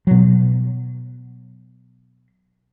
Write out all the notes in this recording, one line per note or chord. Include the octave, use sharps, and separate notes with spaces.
B2 F#3